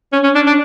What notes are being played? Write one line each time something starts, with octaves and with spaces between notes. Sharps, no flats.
C#4
C#4
D4
D4